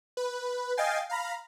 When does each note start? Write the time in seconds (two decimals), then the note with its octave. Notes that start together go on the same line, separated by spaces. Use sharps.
0.17 B4
0.77 D#5 F5 G5 G#5 A6 C7
1.10 F5 A#5 B5